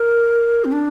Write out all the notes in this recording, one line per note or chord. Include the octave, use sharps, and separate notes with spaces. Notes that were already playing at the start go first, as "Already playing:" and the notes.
Already playing: A#4
C4
D4